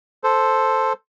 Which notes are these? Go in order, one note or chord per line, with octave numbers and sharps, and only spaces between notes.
A4 C5